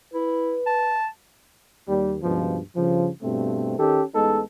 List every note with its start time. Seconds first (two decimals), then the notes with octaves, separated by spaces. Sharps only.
0.14 E4 B4
0.66 A5
1.89 D#2 G3
2.23 C#2 G2 B2 F3
2.76 G2 C#3 F3
3.23 G2 B2 A3 C4
3.78 D#3 C#4 G4 A4
4.14 A1 G#3 B3 D#4 A4